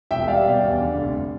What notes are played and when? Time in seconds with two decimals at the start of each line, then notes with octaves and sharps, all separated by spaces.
0.11 E1 E5 G5
0.28 G3 D5 F5
0.46 B2
0.63 E2
0.80 D3
0.97 F1